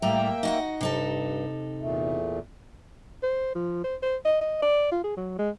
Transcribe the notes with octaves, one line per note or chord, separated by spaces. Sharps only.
A2 G3 A#3 E5 G5 A#5
D#4 F#4 F#5
G2 C3 D#4 A4
E2 A#2 A3
C5
F3
C5
C5
D#5
D#5
D5
F4
G#4
F#3
G#3